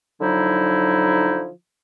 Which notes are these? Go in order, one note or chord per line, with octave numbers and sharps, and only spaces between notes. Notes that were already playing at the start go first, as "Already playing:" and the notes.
D3 F3 F#3 D#4 E4